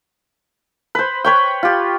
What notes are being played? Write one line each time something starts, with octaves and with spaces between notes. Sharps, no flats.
B4 C5
B4 C#5 G5
F4 G4